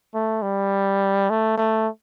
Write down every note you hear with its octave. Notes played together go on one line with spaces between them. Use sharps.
A3
G3
A3
A3